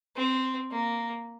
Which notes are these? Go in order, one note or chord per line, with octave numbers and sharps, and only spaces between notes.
C4
A#3